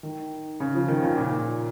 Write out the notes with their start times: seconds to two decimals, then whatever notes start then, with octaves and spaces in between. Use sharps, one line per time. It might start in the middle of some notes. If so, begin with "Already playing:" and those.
0.03 D#3
0.60 C#3
0.75 F3
0.88 D#3
1.03 C#3
1.17 A#2